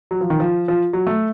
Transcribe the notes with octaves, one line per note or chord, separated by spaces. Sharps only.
F#3
F3
D#3
F3
F3
F#3
A3